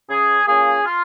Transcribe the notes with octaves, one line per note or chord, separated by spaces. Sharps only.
C#3 G#4
A#3 C#4 F4 G#4
F4